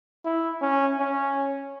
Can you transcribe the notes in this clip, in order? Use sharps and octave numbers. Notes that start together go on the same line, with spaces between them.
E4
C#4
C#4